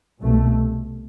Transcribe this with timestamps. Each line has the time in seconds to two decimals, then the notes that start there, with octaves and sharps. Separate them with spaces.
0.19 C2 B2 A3